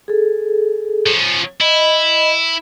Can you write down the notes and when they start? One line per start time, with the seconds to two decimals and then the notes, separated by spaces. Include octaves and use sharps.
0.08 G#4 A4
1.06 F3 C#4
1.61 E4 D#5 B5